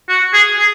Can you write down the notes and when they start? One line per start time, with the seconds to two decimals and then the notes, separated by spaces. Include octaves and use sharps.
0.09 F#4
0.34 G#4
0.59 G#4